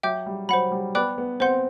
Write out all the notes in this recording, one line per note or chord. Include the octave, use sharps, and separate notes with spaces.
F#3 E5 G5 D6 G6
G3
F#3 C5 F#5 B5
G3
B3 D5 G5 B5 D6 F#6
B3
C4 C5 F#5 C6 G6